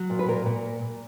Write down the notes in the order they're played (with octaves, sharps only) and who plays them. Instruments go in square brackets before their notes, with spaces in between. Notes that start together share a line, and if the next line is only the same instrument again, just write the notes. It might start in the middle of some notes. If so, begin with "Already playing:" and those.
Already playing: [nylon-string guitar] F#3
A#2
B4
A#2 A#4
A#2